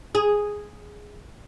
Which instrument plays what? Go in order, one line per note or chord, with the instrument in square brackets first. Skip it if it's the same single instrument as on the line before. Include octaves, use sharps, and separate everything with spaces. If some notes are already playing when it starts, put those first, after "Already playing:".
[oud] G#4